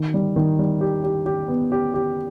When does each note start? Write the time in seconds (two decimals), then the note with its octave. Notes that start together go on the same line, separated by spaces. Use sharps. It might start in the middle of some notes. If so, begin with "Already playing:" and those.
Already playing: D#3
0.14 G3
0.36 D#3
0.59 G3
0.81 G4
1.04 G4
1.26 G4
1.48 B3
1.72 G4
1.94 G4